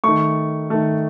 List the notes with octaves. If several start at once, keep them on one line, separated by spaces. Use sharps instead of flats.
D#3 A3 C#6
D#3 A3